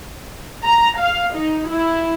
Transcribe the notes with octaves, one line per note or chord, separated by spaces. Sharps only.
A#5
F5
D#4
E4